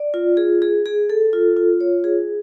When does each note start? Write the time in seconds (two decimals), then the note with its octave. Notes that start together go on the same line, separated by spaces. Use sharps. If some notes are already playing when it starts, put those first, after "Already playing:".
Already playing: D5
0.14 F4
0.37 G#4
0.62 G#4
0.86 G#4
1.10 A4
1.33 F4
1.57 F4
1.81 C#5
2.04 G#4